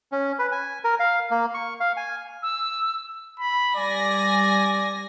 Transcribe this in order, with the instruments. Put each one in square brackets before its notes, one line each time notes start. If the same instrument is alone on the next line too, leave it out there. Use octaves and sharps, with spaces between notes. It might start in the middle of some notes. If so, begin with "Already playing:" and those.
[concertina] C#4
B4
G#5
A#4
F5
A#3
C#6
F5
G#5
[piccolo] E6
[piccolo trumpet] B5
[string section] G3 G#5 A#6 [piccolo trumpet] D5